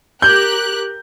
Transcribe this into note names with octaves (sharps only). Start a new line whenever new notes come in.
G4 A#4 F#6 G6